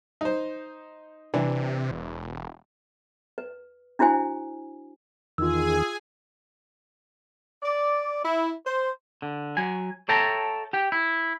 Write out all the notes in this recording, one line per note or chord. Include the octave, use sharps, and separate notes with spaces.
D#4 C5
C3 E3 D4
E1
B4
D4 E4 F#4 C5 G#5
E2 D#3 F4 G#4 G#5 E6
D5
E4
C5
D3
F#3 G#5
A4 C#5 E5 G5 A5 A#5
G4 G5
E4